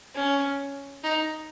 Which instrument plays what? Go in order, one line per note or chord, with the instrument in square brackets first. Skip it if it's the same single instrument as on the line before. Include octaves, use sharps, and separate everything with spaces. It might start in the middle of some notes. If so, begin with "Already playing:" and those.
[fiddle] C#4
D#4